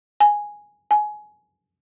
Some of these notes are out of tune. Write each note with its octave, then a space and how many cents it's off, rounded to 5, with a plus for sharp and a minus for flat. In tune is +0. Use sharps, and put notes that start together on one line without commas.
G#5 -5
G#5 +20